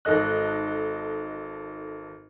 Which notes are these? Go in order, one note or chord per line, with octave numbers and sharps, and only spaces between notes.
G#1 D#4 A4 D#5 F#6